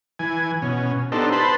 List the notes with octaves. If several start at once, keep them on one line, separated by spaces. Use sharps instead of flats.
E3 G#5
B2 C#4
B3 D4 D#4 G4 A4 C5
B4 C5 A5 B5 C6